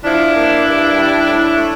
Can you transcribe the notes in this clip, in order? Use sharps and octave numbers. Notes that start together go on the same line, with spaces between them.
F3 D4 E4
A#3
G2
G3
A2
A3